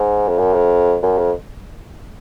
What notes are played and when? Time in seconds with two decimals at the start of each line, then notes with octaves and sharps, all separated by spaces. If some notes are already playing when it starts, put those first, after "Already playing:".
Already playing: G#2
0.28 F2
0.38 F#2
0.54 F2
1.02 F#2
1.18 F2